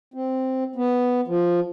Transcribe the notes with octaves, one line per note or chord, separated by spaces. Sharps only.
C4
B3
F3